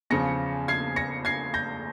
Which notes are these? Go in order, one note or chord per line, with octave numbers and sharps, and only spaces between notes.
E2 C#3 F3 A#6 C#7
G#6 C7
A#6 C#7
G#6 C7
G6 A#6